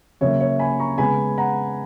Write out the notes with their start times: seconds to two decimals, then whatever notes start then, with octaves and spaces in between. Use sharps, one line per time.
0.21 C#3 F#3 A#3 C#5 E5
0.40 C#5 E5
0.59 G#5 B5
0.79 A#5 C#6
0.98 C#3 G#3 B3 G#5 B5
1.38 F#5 A#5